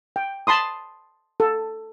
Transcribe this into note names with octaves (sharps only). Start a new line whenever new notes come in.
G5
A5 B5 C6 D#6
A4